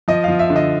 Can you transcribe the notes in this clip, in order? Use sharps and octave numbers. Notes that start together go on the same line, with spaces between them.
F3 D#5
F3 F5
E5
D3
D#5